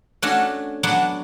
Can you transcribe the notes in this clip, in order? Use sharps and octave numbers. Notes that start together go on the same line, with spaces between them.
A3 C#4 D4 F#4
F#3 B3 D4 F#4